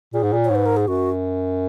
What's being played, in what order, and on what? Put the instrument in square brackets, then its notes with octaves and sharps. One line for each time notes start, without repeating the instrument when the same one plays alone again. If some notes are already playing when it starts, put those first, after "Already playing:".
[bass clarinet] A#2 [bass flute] G#4
[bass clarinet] G#2
A#2
[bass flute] C#5
[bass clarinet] G#2
[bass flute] B4
A#4
G#4
[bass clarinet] F#2 [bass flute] F#4